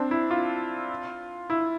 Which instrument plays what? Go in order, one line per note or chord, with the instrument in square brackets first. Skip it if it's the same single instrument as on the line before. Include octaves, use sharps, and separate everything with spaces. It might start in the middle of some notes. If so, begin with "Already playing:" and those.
Already playing: [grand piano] C4 D4
E4
F4
E4